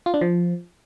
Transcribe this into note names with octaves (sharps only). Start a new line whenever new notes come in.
F4
D4
F3